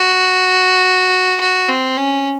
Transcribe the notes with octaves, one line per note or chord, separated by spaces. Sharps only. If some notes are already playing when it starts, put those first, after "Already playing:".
Already playing: F#4
F#4
C4
C#4